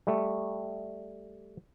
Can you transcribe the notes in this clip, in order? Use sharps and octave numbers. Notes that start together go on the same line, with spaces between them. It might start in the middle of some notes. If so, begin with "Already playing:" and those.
G3 A3